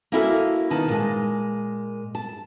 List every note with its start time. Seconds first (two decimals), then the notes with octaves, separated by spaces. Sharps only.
0.12 A#3 C#4 E4 F#4 A4
0.70 B2 D#3 A5
0.88 A#2 G#3
2.15 A5